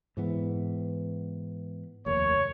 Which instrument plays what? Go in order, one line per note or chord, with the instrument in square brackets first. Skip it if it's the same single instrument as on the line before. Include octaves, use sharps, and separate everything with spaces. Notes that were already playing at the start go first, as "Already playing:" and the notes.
[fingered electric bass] G#2 E3 B3
[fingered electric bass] F1 D#2 A#3 [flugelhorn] C#5